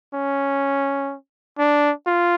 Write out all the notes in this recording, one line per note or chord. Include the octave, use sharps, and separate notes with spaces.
C#4
D4
F4